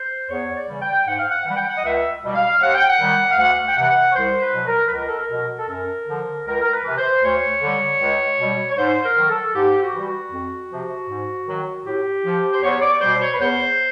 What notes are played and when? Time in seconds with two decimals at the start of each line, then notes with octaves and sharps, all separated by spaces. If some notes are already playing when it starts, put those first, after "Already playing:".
Already playing: C5
0.30 E2 C#5
0.55 D5
0.68 C#3 E3 G3
0.82 G5
1.07 G#2 F#5
1.19 F5
1.30 F#5
1.45 E3 G3 F#5
1.56 G5
1.67 F#5
1.77 D#5
1.84 C#2 E5
2.23 B2 G3
2.35 F5
2.61 D#2 F#5
2.75 G5
2.88 F#5
2.99 D#3 G3
3.31 F5
3.38 D2 F#5
3.67 G5
3.77 C3 E3 F#5
4.11 C#5
4.15 C2 C5
4.41 B4
4.54 B2 F#3
4.67 A#4
4.88 B4
4.93 C#2 A#4
5.07 A4
5.19 A#4
5.30 B2 F#3
5.58 A4
5.69 F#2 A#4
6.08 D3 F3
6.46 C#2 A#4
6.61 A#4
6.72 B4
6.85 C3 E3
6.98 C5
7.23 D2 C#5
7.61 D3 G3
8.00 C#2
8.39 B2 G3
8.70 C#5
8.77 G#2 C5
9.04 A#4
9.16 D#3 F#3
9.29 A4
9.54 G#2 G4
9.81 F#4
9.94 E3 G3
10.07 F#4
10.32 F2
10.70 C3 F3
11.08 G#2
11.47 D#3 F#3
11.85 A2 G4
12.25 F3
12.53 C5
12.62 E2 C#5
12.81 D5
13.01 B2 G3 C5
13.21 C#5
13.33 B4
13.40 E2 C5